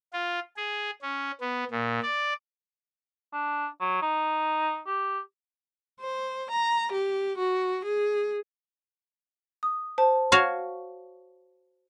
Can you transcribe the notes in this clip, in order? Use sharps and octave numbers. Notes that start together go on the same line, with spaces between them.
F4
G#4
C#4
B3
A#2
D5
D4
F#3
D#4
G4
C5
A#5
G4
F#4
G#4
D#6
C5 A5
F#4 C#5 F5